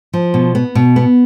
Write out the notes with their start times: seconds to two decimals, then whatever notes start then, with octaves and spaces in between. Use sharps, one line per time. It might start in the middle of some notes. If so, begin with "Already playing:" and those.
0.13 F3
0.34 B2
0.55 B3
0.75 B2
0.96 B3